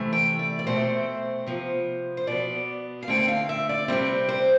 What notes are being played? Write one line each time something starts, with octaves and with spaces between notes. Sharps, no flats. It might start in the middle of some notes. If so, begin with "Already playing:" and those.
Already playing: C3 E3 A3
G5
D5
D5
B2 A3 C4 C5
C3 F3 B3
C5
B2 B3 D5
F5
D3 A3 C4 G5
G5
F5
E5
D5
C3 G3 C4 B4
C5